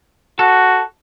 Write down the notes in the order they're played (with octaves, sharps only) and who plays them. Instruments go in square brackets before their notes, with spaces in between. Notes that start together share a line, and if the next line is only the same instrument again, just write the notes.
[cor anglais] F#4 [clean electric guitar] A4